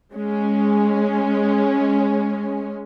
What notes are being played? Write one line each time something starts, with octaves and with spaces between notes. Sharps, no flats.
G#3 C#4